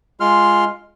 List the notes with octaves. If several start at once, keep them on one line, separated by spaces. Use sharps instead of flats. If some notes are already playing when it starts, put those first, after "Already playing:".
G#3 F4 C6 F6